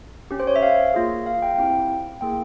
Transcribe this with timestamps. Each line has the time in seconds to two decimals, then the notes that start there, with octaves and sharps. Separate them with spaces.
0.31 C#4 G4
0.40 C5
0.47 C#5
0.56 E5
0.63 F5
0.94 A#3 F4 G#4
1.26 F5
1.42 G5
1.58 C4 E4 G4 G5
2.21 A#3 E4 G#4 G5